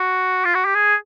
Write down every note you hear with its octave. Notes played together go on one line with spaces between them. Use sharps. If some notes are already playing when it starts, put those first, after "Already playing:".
Already playing: F#4
F4
F#4
G4
G#4